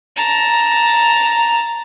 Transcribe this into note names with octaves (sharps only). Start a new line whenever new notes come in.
A5 A#5